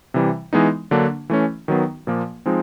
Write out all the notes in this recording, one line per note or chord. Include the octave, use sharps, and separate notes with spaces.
C3 E3 G3
E3 G#3 B3 D#4
D3 F#3 A#3 D4
E3 A3 C#4
D#3 F#3 B3
A#2 F3 A#3
F3 G#3 C4 D#4